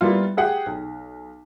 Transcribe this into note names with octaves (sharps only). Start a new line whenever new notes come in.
G3 A#3 B3 E4 F4
G4 G#4 F#5 G5
B1